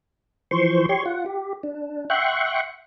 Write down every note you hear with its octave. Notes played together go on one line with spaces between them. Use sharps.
E3 F3 C5 C6 C#6
G4 C#5 C6 C#6
F4 F#5
G4
D4
E5 F#5 G5 C6 C#6 F#6